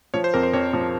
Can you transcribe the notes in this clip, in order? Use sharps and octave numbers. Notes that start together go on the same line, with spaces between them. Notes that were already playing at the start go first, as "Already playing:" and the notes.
F3 C#5
C5
F2 A#4
C5
F2 C#5
F3